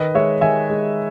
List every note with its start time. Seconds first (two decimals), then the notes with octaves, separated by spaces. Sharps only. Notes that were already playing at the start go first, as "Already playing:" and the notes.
Already playing: D#3 B4 D#5
0.14 G#3 C#5 E5
0.41 D#3 E5 G#5
0.70 G#3